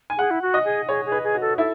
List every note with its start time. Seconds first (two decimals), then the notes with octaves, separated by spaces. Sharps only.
0.10 G#5
0.18 G#4 F#5
0.31 E4
0.42 F#4
0.54 D#5
0.65 G#4
0.89 G#4 C#5
1.06 G#4
1.12 B4
1.24 G#4
1.35 F#4
1.41 A4
1.58 E4 A4